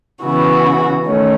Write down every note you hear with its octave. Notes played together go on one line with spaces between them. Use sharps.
C#3 E3 B3 F#4
D#3 A3 C#4